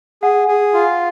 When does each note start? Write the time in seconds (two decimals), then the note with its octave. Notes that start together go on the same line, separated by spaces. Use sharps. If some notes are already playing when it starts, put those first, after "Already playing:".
0.23 G#4 F#5
0.48 G#4
0.74 F4